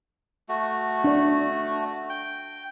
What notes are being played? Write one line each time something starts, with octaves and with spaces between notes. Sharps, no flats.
A3 F#4
D4 D5
G5